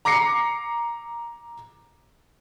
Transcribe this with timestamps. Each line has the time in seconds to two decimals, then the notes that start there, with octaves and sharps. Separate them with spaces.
0.05 A#5 D6 A#6 C7 C#7